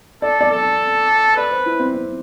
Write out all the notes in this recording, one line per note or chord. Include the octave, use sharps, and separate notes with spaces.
A4 D5
D5
A4
B4 D5
C5
E4
C4
C4